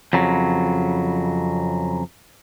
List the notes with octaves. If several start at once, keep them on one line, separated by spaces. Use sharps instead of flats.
F2 C#3 F#3